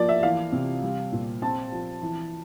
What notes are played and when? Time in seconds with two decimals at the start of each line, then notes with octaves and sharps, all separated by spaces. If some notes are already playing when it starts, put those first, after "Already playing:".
Already playing: F3 A#3 D5
0.09 E5
0.23 E3 F5
0.52 C3
0.83 G3
1.12 A#2
1.42 C4 A5
1.72 F3
2.02 E3